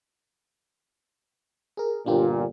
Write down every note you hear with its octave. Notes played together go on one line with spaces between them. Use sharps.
G#4 A#4
G1 A#2 D4 F4 G4